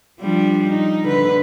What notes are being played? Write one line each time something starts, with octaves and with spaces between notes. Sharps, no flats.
F3 G3 D4
D#4
D3 B4